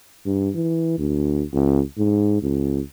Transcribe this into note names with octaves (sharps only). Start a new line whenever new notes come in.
G2
E3
D2
C#2
G#2
C#2